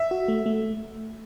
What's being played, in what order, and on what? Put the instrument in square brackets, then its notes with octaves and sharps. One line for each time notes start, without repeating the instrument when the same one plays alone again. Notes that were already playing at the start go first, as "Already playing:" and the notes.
Already playing: [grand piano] E5
[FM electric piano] F#4
A3
A3